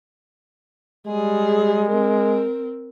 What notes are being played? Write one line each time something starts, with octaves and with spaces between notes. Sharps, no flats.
G3 G#3 G#4
C4 A#4